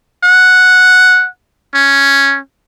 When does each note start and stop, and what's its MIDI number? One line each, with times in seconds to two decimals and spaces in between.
0.23 1.27 78
1.74 2.39 61